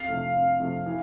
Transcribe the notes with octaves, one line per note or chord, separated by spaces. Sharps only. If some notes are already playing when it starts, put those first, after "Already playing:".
Already playing: F2 F5
C3 F3 A3
F2
C3 F3 A3
E3